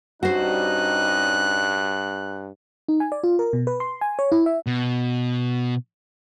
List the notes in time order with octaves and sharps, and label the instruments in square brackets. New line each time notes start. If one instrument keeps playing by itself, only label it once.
[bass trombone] G2 [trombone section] G3 C#4 D#4 [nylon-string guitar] F#4 C5 [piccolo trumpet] F#6
[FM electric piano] D#4
G#5
D5
F4
A#4
B2
B4
C6
G#5
C#5
E4
E5
[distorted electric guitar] B2